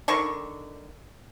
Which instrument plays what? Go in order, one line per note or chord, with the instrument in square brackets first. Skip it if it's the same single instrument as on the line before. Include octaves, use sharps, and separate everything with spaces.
[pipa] D3 D#3 C#6